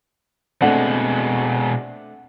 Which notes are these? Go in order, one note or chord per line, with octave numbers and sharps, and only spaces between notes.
B2 G#3 A3 C4 D4 F#5